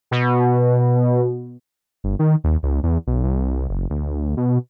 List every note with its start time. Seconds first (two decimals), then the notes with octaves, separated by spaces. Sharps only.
0.11 B2
2.04 G1
2.19 D#3
2.44 D#2
2.63 C#2
2.83 E2
3.07 B1
3.23 C2
3.69 F#1
3.90 D2
4.37 B2